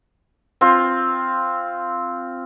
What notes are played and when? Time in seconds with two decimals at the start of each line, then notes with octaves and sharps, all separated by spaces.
0.61 C4 F4